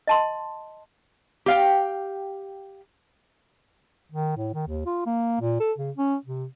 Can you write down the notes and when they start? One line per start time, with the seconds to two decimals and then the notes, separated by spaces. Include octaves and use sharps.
0.07 D#5 A5 C6
1.46 G4 F5 G5
4.12 D#3
4.37 A2
4.54 D#3
4.67 D#2
4.86 F4
5.06 A#3
5.41 A#2
5.60 A4
5.78 C#3
5.97 C#4
6.25 C3